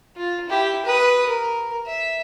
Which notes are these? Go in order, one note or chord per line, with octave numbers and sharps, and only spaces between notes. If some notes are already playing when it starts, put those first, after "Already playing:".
F4
E4 G4
B4 D#6
A#4
E5